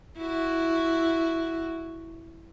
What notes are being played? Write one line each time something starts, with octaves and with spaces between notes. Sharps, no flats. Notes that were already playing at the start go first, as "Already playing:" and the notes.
E4 F#4